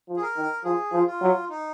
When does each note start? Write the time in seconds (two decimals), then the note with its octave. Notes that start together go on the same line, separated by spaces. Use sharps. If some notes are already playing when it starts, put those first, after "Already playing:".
0.09 F3
0.17 G#4
0.22 A#4
0.37 D#3
0.64 F3 G#4
0.92 F3
1.07 F4
1.21 F#3
1.50 D#4